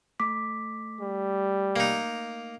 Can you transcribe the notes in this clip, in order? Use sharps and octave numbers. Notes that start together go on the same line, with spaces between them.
A3 D6 B6
G3
A#3 D#4